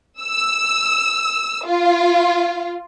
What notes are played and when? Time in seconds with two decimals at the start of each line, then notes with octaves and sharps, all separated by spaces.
0.21 E6
1.66 F4